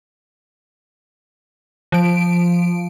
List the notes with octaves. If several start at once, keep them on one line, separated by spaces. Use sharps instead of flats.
F3 D7